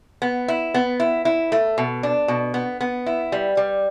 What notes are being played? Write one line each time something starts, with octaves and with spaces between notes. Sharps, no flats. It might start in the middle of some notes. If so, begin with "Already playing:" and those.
B3
E4
B3
E4
E4
A3
B2
D4
B2
B3
B3
E4
G3
G3